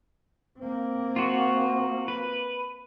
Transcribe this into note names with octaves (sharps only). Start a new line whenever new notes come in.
A#3 C4
F4 F#4
B4